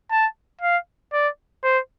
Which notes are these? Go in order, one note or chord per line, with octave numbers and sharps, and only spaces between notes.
A5
F5
D5
C5